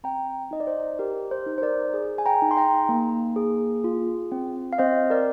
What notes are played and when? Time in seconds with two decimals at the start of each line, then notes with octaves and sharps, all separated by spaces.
0.04 C4 G5 A#5
0.51 D#4 D#5
0.60 D5
0.67 C5
0.99 G4 A#4
1.31 C5
1.46 D#4
1.58 C5
1.62 A#4 D5
1.94 G#4
2.18 G#5
2.26 G5 A#5
2.42 D#4
2.51 C6
2.57 G5 A#5
2.89 A#3
3.36 G#4
3.84 F4
4.32 C4
4.73 F5
4.78 C4 C5 D#5
5.10 A#4 D5